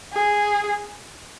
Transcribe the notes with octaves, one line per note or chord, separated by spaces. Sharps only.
G#4